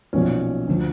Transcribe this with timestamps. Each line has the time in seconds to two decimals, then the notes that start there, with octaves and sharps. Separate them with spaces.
0.13 B1 A#2 F3 C#4
0.67 D2 D3 F3